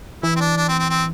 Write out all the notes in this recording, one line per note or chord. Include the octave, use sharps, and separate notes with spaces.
E3 E4
C4
D4
D4
C4
C4
C4